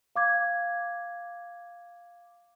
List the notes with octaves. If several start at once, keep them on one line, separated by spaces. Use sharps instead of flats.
F5 D6 G#6